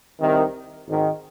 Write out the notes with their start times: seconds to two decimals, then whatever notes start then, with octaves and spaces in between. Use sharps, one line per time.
0.20 C2 C3 D#3
0.87 G#1 G#2 D#3